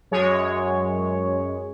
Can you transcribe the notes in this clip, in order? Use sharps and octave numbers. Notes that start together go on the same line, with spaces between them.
F#2 G#3 C#5